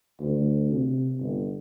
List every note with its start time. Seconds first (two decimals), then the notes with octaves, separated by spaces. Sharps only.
0.20 D2
0.71 C3
1.20 G1